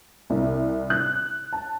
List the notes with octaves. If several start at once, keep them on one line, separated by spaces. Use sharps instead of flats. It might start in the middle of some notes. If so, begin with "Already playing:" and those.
C2
F#6
A5